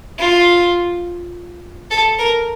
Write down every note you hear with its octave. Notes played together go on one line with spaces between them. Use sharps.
F4
A4
A#4